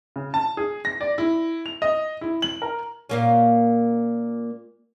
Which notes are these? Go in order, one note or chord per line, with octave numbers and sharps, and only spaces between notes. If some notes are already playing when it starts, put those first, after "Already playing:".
C#3
A5
G#4
A#6
D5
E4
F7
D#5
E4
F#7
A#4
A#2 A#3 C#4